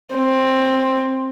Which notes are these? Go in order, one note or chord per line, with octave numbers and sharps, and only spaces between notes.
C4